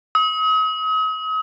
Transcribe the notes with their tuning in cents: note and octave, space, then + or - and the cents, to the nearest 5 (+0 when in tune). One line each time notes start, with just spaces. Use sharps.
D#6 +40